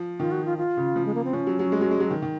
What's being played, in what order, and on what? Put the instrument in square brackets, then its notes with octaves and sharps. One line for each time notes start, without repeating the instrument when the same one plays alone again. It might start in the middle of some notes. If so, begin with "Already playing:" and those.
Already playing: [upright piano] F3
[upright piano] D#3 [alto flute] F4
[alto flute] F#4
F4
F4
[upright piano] C#3
F3
[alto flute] G#3
A#3
C4
[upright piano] F3 [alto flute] C#4
[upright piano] F#3
F#3
G#3
F#3
G#3
F#3
D#3
D#3